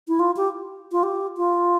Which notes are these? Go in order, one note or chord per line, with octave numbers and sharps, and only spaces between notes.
E4
F4
G4
F4
G4
F4